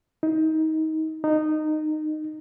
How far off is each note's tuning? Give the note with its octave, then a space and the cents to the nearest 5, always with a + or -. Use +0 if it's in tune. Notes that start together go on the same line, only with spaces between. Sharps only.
D#4 +25
D#4 -15